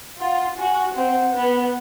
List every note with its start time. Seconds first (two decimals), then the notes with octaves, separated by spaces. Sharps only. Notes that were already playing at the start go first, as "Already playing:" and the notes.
0.20 F4 F#5
0.58 F#4 G#5
0.95 C4 F#5
1.33 B3